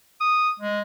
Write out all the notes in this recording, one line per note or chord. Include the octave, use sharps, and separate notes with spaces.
D#6
G#3